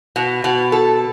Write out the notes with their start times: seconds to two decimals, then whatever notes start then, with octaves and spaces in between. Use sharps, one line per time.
0.16 B2
0.44 B2
0.72 A4